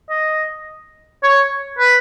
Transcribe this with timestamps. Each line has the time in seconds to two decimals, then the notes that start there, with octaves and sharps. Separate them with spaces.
0.10 D#5
1.23 C#5
1.79 B4